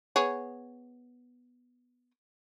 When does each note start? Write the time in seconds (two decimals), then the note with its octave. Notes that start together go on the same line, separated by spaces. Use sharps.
0.16 B3 G#4 C#5